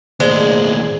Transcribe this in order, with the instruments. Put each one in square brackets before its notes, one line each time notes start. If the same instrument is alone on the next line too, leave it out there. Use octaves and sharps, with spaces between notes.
[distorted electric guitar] D#2 A2 [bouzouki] G#3 [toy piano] C5 D5